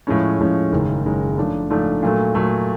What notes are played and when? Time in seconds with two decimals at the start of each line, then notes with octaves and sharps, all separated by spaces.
0.07 A2 F3 G#3 C#4
0.39 A2 F3 G#3 C#4
0.72 F#1 F#2 D#3 G#3
1.04 F#1 F#2 D#3 G#3
1.38 G#2 F3 A3 D4
1.70 G#2 F3 A3 D4
2.02 A#2 F#3 A3
2.35 A#2 F#3 A3